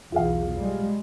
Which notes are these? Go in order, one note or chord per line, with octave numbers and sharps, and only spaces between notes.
B1 E2 F4 G#4 F5
G3 G#3